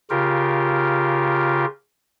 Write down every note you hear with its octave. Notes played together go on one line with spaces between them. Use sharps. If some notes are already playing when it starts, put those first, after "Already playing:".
C#3 F4 G4 A#4